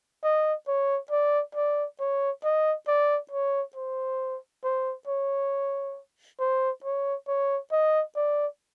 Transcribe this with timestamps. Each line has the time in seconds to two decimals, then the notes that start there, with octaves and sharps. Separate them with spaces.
0.23 D#5
0.68 C#5
1.11 D5
1.55 D5
2.00 C#5
2.44 D#5
2.88 D5
3.31 C#5
3.76 C5
4.64 C5
5.07 C#5
6.40 C5
6.84 C#5
7.28 C#5
7.72 D#5
8.16 D5